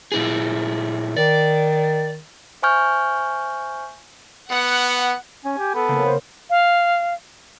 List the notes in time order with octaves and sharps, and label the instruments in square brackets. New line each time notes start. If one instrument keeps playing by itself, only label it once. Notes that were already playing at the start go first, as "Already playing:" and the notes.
[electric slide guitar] A#2 E4 G#4
[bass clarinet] D#3 [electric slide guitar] D5
[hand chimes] C5 E5 G#5 C#6 F6 G6
[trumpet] B3 [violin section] F#5
[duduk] C#4 [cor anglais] G#5
[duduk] G4
[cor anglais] B3 [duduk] A4
[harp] C#3 A#3 C4
[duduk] C5
[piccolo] F5